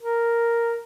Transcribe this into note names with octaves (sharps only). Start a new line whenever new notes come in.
A#4